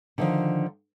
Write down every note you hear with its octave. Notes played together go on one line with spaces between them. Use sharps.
D3 D#3 F3